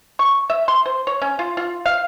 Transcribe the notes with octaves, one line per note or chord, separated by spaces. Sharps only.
C#6
E5
C6
C5
C#5
C#4
F4
F4
F5